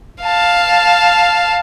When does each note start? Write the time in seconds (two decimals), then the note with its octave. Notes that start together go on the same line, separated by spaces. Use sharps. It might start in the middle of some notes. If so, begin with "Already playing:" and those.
0.23 F5 A5